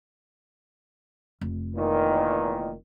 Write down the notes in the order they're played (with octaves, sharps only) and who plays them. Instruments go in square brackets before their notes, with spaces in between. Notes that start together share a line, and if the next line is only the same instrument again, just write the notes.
[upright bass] F1
[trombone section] E2 A#2 D#3